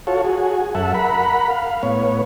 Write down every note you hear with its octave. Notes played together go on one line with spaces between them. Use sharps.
F4 F#4 A4 C#5
F#4 G#4
F#2 A4 E5 F#5
A#4 F#5 B5
F5
A2 B3 C#5